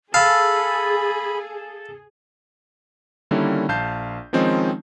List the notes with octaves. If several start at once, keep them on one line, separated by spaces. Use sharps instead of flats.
G#4 A4 F5 B5
D3 D#3 G3 A#3 C#4 E4
A#1 F5 A5 G6 C7
D#3 F3 G#3 C4 C#4 D#4